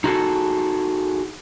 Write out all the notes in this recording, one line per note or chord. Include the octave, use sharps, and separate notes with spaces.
D#4 F#4 G#4 A4